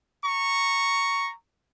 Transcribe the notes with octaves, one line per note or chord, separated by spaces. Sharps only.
A#5 C#6